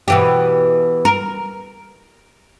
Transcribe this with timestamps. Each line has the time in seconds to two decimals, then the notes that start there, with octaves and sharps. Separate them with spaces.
0.08 B2 E3 G4
1.05 A#4